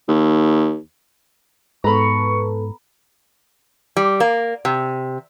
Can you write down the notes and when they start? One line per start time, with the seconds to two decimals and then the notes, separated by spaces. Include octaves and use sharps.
0.08 D#2
1.84 G#2 B3 A4 B4 A#5 B5 C#6
3.97 G3
4.20 A#3
4.65 C3